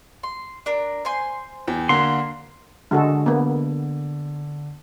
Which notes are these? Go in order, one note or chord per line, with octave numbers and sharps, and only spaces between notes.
C6
D4 A#4
C5 G#5 C6
E2 G5
D3 A#3 F#4 C6
D3 G#3 F#4 A4
A#3 B3